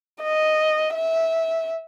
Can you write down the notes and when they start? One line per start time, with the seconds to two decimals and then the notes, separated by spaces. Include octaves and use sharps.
0.23 D#5
0.94 E5